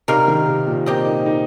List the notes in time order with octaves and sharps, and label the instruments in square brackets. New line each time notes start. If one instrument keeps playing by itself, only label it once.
[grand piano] C3 [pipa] G3 D#4 A#4 F5
[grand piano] D#3
C3
A#2
[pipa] A#3 G4 D#5 [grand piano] C4
[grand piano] D#4
D#4